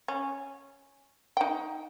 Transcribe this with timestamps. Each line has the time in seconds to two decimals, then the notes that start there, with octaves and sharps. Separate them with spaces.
0.08 C#4
1.37 D#4 G5